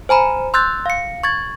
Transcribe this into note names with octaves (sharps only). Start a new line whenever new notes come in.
C5 G#5 A#5 B5
C6 E6 F#6 G6 A6
F5 C#7
C#6 G#6 A6